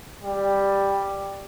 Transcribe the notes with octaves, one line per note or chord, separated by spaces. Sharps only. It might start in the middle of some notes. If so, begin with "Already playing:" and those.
G3